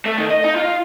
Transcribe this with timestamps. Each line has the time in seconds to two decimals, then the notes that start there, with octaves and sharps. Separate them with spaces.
0.05 A3
0.17 D#3
0.31 D#5
0.44 D#4
0.56 F4